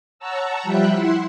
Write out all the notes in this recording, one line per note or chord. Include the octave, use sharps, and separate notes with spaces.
C#5 F#5 A5 A#5 E6
F3 G3 E5 G5 B5 F#6
E4 F#5 C6